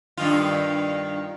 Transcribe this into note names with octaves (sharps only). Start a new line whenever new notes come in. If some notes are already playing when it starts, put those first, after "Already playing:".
G2 D#3 F4